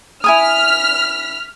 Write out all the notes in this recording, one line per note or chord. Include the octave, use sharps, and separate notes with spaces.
E4 G#5 D#6 F6 B6